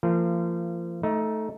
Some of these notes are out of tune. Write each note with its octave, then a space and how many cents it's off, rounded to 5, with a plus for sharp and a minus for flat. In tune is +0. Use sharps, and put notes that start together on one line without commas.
F3 -30 A#3 -40
A3 -5 D#4 +15